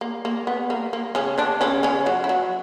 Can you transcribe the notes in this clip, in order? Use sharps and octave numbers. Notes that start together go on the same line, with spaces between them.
A#3
A#3
B3
A#3
A#3
C#3 C#4
D3 D4
C#3 C#4
C#3 C#4
F#3 F#4
E4
F#3 F#4